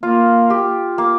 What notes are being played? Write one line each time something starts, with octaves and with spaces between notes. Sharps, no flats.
A#3 F4
G4
A#3